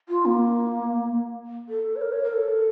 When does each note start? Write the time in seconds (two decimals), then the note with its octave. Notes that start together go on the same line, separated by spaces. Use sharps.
0.09 F4
0.25 A#3
1.69 A4
1.96 C#5
2.01 A#4
2.12 C#5
2.23 A#4
2.33 A4